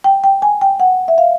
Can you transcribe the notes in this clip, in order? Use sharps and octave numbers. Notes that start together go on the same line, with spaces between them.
G5
G5
G#5
G5
F#5
E5
F5